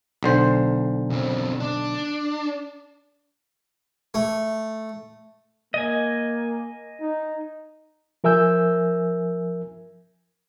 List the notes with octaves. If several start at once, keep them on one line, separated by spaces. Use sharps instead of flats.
B1 D3 C5
F#2 C4
D4
A3
A#3 D#5 G#5
D#4
F3 A#4 E5 G#5 E6 G6